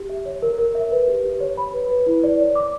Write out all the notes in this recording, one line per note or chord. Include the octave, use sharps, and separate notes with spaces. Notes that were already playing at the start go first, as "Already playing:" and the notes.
Already playing: G4
E5
C#5
A#4
A#4
E5
B4
G4
G4
C#5
B5
B4
B4
E4
D5
C#5
D6